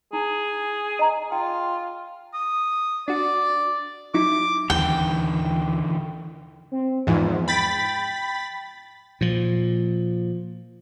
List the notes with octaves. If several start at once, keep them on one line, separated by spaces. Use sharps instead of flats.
E4 G#4
D#5 A#5
F4 G5
D#6
D4 F#4 D5
F#3 D#4 E4 D6
D#2 D3 E3 C4 G5
C4
E2 G#2 F3
G5 B5 A6 B6
A#2 F3